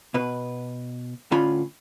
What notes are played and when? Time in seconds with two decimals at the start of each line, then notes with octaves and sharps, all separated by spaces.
0.14 B2 B4
1.31 A2 D3 C#4 F4 B5